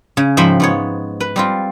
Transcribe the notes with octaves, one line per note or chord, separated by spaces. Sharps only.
C#3
G#2 F3 E5 G5 B5
G#2 B3 C#5
B4
G3 C4 F4